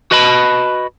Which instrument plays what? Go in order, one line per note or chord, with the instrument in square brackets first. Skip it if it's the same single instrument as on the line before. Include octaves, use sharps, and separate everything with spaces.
[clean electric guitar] F#4 B4 D#5 A5 B5